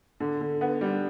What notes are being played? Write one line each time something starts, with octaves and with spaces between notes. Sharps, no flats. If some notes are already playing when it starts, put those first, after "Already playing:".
D3
D3
B3
G3